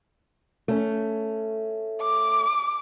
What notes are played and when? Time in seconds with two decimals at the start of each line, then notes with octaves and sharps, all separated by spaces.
0.68 A3 C#4
2.02 D6